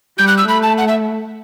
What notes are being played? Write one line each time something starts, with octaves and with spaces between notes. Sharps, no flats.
G3 G6
F#6
E6
A3 B5
A5
F#5
E5